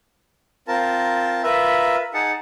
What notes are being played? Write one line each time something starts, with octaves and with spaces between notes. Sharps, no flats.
C4 F4 A#4 A5
F4 A#4 B4 E5
D#4 G#4 F#5 A5